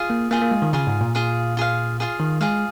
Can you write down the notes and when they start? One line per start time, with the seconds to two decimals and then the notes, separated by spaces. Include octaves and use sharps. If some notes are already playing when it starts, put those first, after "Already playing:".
Already playing: F4 G#4 F5
0.10 A#3
0.31 A#3 F4 G#4 F5
0.42 A#3
0.51 G#3
0.62 D#3
0.73 C#3 F4 G#4 F5
0.87 G#2
1.01 A#2
1.15 F4 G#4 F5
1.57 F4 G#4 F5
2.00 F4 G#4 F5
2.20 D#3
2.41 G#3 F4 G#4 F5